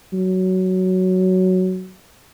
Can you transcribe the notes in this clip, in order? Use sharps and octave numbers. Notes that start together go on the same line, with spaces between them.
F#3